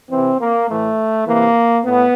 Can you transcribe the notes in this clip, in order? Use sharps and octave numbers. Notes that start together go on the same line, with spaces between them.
C3 E3 C4
A#3
A2 E3 A3
C3 E3 A#3
A2 B3